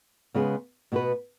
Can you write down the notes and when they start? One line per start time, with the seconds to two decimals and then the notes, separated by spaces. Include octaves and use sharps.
0.34 C#3 G#3 B3 G#4 B4
0.92 B2 B3 F#4 B4